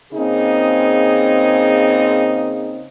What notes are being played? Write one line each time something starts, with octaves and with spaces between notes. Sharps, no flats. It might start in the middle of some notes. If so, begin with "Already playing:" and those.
C#3 A#3 C4 D#4 G#4